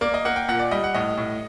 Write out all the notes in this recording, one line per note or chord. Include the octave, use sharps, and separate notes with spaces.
A#3 D5
D#5
A#3 F#5
G5
A#2 F#5
D5
G3 D#5
F#5
A2 D#5
A2